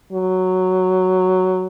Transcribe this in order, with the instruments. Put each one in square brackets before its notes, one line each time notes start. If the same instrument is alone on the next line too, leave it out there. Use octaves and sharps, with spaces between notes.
[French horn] F#3